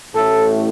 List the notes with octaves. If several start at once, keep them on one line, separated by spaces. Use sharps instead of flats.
A1 A2 A3 A4